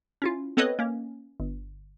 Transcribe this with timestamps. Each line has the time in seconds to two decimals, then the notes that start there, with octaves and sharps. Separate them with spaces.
0.22 C#4 E4 F4
0.57 B3 C4 A4 B4 C#5 D#5
0.79 A#3 C#4
1.40 G1